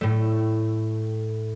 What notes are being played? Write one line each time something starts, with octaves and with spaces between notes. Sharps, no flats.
A2 A3